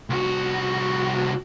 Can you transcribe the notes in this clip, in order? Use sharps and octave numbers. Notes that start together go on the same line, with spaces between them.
C2 F#4